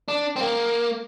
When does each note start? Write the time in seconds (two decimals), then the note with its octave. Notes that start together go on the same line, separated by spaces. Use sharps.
0.08 D4
0.36 C4
0.41 A#3